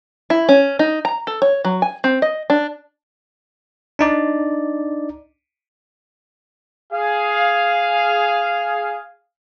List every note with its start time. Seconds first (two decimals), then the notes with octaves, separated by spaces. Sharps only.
0.30 E4
0.49 C#4
0.79 D#4
1.05 A#5
1.27 A4
1.42 C#5
1.65 F#3
1.82 G#5
2.04 C4
2.22 D#5
2.50 D4
3.99 D4 D#4 D5
6.93 G#4 F5